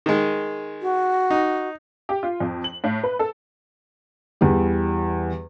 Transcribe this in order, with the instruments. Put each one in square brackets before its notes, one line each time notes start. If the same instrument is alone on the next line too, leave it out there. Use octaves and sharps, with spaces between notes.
[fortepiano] D#3 G#3
[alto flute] F#4
[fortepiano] D#4
[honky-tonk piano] G4
F4
F2
F#7
A2
B4
A4
[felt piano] E2 G3